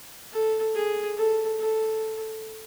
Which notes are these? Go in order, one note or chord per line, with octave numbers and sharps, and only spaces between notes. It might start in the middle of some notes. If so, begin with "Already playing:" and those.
A4
G#4
A4
A4